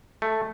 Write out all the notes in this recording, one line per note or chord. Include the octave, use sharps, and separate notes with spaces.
A3